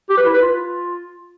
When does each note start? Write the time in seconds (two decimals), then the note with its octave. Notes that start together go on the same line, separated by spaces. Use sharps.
0.09 G4
0.17 B4
0.25 E4
0.33 B4
0.41 F4